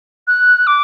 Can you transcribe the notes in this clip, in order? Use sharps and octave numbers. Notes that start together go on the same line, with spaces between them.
F#6
D6